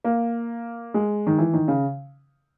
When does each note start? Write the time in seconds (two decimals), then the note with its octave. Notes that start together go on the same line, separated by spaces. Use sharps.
0.04 A#3
0.94 G#3
1.27 D#3
1.38 E3
1.54 D#3
1.68 C#3